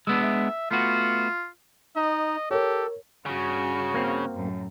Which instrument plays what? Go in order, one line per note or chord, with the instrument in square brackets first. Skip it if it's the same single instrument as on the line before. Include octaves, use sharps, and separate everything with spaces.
[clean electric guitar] G#3 B3 D4 [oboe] E6
[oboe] E5
[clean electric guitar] A3 B3 F#4 [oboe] F4
[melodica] D#4 [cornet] D#5
[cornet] G4 [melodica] A4 [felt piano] A#4 C#5
[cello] G2 F#4 [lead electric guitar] C#3
[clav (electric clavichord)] A#3 C4
[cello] F#2 A2